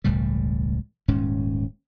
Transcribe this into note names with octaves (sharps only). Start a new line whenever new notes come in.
E1 C#2 A2 G3
D#1 G#2 C#4